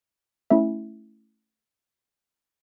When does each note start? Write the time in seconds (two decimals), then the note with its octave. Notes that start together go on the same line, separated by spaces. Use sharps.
0.50 A3 C#4 E4 E5